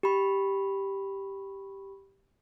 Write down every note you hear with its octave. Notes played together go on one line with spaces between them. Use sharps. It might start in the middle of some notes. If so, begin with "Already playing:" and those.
G4 B5